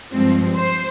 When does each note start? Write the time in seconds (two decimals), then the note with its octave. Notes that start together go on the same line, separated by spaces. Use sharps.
0.13 G2 F3 G#3 C4
0.56 C5